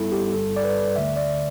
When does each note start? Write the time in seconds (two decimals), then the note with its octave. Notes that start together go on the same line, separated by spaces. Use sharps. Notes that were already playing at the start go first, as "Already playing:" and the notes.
Already playing: G2 G3 B3 E4 A4
0.12 G4
0.33 G1 G2 G3 A4
0.56 D5
0.64 B4
0.96 D2 D3 A3 E5
1.17 D5